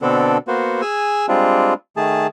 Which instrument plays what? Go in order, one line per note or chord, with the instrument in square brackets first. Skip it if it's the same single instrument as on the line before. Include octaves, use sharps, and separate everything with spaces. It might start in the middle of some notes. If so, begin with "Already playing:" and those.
[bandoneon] B2 D3 B3 C4 D4 A4
A#3 B3 F#4 C5
G#4 G#5 E6
G3 G#3 C4 D4 F4
D#3 A3 G#4 A5